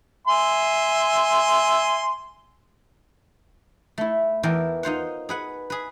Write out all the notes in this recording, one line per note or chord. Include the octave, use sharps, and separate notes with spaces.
E5 G#5 C6
A3 E4
E2 E3 A#4 D5 G5 A5
D#4 F4 C5 F#5
G#4 B4 F#5
G#4 B4